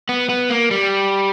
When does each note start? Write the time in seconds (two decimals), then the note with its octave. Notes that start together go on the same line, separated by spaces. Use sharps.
0.09 B3
0.29 B3
0.50 A#3
0.71 G3